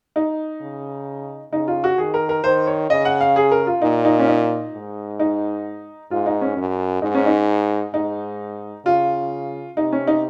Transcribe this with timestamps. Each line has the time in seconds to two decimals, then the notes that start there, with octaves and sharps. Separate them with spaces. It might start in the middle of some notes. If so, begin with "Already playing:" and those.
0.16 D#4
0.61 C#3
1.53 C#3 D#4
1.68 F4
1.84 F#4
1.98 D#3 G#4
2.14 A#4
2.29 A#4
2.44 D#3 C5
2.67 C#5
2.90 C#3 D#5
3.05 F#5
3.21 F5
3.36 G#4
3.51 A#4
3.67 F4
3.82 A#2 D#4
4.05 D#4
4.19 C#4
4.27 D#4
4.74 G#2
5.20 D#4
6.11 G#2 F4
6.26 D#4
6.42 C#4
6.57 F#2
7.02 G#2 D#4
7.15 C#4
7.26 D#4
7.94 G#2 D#4
8.85 C#3 F4
9.77 C3 D#4
9.93 C#4
10.07 D#4